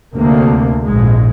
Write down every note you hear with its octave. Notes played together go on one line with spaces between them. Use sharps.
D2 C3 A#3
A#1 G#2 G#3